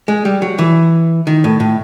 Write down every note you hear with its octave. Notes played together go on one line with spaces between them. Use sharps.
G#3
G3
F#3
E3
D#3
A2
A2